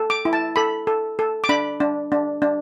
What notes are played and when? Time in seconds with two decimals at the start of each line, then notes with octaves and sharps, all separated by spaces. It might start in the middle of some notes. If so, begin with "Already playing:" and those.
Already playing: A4
0.10 D6
0.25 E4
0.33 A5
0.56 A4 B5
0.87 A4
1.19 A4
1.44 D6
1.49 D4 B5
1.80 D4
2.12 D4
2.42 D4